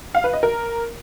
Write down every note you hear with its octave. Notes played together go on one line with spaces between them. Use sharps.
F5
B4
D#5
A#4